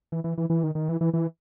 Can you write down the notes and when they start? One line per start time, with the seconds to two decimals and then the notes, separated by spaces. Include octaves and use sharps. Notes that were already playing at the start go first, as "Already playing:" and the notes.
0.12 E3
0.24 E3
0.38 E3
0.50 E3
0.63 D#3
0.75 D#3
0.89 E3
1.01 E3
1.13 E3